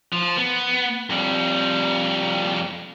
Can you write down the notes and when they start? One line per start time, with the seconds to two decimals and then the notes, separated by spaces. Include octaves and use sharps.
0.13 F3
0.38 B3
1.10 F2 G3